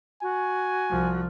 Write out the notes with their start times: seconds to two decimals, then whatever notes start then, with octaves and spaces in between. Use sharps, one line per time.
0.22 F#4 G#5
0.90 C2 F3